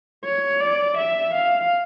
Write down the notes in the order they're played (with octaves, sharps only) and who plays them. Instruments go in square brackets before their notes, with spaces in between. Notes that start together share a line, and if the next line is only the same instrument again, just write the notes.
[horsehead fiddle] C#5
D5
E5
F5